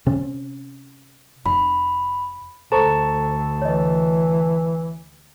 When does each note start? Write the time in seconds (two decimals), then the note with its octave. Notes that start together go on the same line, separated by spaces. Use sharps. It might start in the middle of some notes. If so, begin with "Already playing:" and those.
0.06 C3 C#4
1.46 F1 B5
2.72 D2 A4 C5 A5 A#5 C#6
3.62 E3 C#5 D#5